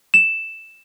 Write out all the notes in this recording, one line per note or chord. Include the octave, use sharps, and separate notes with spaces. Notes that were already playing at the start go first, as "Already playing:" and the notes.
E7